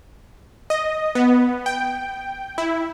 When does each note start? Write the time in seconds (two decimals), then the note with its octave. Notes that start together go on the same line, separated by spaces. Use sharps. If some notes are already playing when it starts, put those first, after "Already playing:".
0.70 D#5
1.15 B3
1.66 G5
2.58 E4